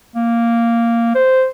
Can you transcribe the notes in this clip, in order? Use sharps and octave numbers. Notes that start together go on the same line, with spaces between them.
A#3
C5